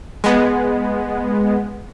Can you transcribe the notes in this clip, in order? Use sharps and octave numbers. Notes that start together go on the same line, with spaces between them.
G#3 B3